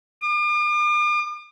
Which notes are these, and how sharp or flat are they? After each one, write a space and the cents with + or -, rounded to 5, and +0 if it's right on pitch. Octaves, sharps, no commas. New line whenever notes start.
D6 +45